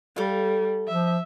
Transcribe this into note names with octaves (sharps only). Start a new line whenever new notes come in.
G3 A4 F5
F3 E5